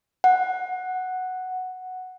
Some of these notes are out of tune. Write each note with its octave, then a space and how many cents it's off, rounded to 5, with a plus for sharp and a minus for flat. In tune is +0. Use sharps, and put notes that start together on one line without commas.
F#5 +0